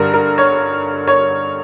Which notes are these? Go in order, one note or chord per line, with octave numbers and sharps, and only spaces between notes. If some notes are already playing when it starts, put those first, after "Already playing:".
Already playing: G2 D3 G3 A#4
A#4
C#5
C#5